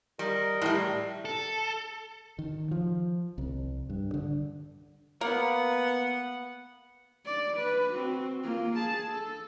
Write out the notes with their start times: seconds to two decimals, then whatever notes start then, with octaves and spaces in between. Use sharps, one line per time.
0.19 G3 A#4 D#5
0.62 A2 G3
1.25 A4
2.39 D#3
2.71 F3
3.38 C2
3.90 G2
4.14 D3
5.21 A#3 B3 F#5
7.26 D5
7.57 B4
7.94 C4 F#4
8.44 A#3 F4
8.77 G#4 A5
9.11 A4